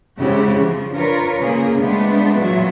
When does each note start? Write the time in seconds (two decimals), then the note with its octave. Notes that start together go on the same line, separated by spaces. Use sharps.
0.18 C#3 G#3 C4 E4 F#4 G4
0.57 F3
0.93 D4 F4 A#4 B4 C#5
1.39 C#3 A#3 G#4
1.79 G#3 A3 B3 C4 D4 F4
2.40 A#2 E3 F#3 F4 F#4 E5